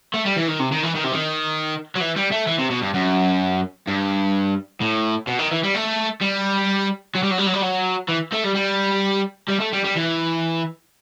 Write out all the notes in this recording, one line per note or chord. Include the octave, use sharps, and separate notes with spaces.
A3
G3
E3
D#3
C3
D#3
E3
D#3
C3
D#3
F#3
E3
G3
A3
E3
C3
B2
G2
F#2
G2
A2
B2
D#3
E3
G3
A3
G3
F#3
G3
F#3
G3
F#3
G3
F#3
E3
A3
G3
G3
G3
A3
G3
G3
E3